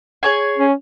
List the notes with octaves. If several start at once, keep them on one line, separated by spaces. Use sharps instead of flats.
G#4 C#5 G#5
C#4